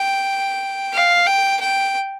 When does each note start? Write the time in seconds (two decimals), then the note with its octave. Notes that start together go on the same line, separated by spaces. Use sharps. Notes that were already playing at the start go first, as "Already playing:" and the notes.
Already playing: G5
0.93 F5
1.27 G5
1.60 G5